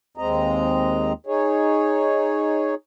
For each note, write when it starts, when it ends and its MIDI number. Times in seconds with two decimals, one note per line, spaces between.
0.17 1.13 39
0.17 1.13 56
0.17 1.13 60
0.17 1.13 75
0.17 1.13 82
1.27 2.75 63
1.27 2.75 68
1.27 2.75 73